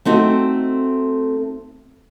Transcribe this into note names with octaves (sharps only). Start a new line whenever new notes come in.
A3 C4 D#4 F#4